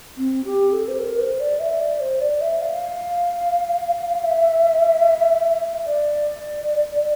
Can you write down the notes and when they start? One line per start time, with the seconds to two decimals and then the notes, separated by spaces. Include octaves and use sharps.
0.18 C4
0.45 G4
0.73 A4
0.88 C5
0.99 A#4
1.20 C5
1.40 D5
1.60 E5
1.80 D5
2.00 C5
2.20 D5
2.41 E5
2.61 F5
4.24 E5
5.86 D5